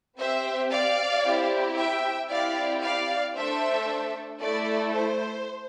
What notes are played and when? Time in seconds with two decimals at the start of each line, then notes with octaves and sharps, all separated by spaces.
0.18 C4 G4 C5 E5
0.71 D5 F5
1.24 C4 E4 G4
1.76 E5 G5
2.29 C4 E4 G4 D5 F5
2.82 D5 F5
3.34 A3 D4 A4 C5 E5
4.40 A3 E4 A4 D5
4.93 C5